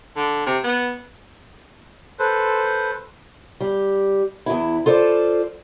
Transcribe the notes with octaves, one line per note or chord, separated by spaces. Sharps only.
D3
C3
B3
A4 B4 C5
G3
E2 E4
F4 A4 C5 D5